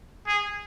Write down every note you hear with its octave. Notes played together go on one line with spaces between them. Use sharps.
G#4